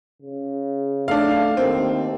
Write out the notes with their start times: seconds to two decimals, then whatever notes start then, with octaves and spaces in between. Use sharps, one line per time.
0.22 C#3
1.08 A3 D4 F5
1.57 D#2 C4